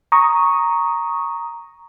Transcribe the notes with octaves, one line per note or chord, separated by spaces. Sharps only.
A#5 C#6 D#6